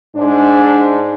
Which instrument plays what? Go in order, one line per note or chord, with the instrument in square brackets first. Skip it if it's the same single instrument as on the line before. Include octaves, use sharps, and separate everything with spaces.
[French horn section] G#2 D4